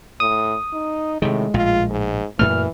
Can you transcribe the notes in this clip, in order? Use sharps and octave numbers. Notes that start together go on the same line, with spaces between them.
A2 D#6
D#4
A2 C3 D#3 G#3
A#1 A2 F4
G#2
F#2 A#2 E3 A3 F6